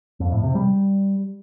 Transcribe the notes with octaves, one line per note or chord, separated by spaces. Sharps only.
F2
A2
C3
G3